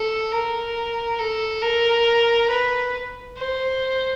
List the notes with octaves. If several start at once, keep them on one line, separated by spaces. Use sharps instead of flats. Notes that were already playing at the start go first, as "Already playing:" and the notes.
Already playing: A4
A#4
A4
A#4
B4
C5